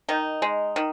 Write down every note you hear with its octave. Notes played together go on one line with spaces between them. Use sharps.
D#3 D#4
G#3
D#3